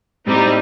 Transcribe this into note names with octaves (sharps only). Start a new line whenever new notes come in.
A2 G3 C4 D#4